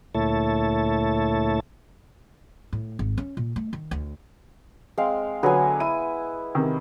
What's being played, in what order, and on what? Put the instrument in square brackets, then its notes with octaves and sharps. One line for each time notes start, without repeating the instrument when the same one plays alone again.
[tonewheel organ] D2 A#2 A3 E4 C#5 A5
[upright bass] A2
G#1
C#4
A#2
A3
D#3
D2
[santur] G#3 C4 F5
[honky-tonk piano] D3 F#3 [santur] B3 G#5
[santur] E4 [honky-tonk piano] D#7
[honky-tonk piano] C3 D#3